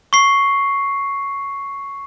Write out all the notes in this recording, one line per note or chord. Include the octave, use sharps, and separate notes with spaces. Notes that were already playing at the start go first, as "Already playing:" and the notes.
C#6 C7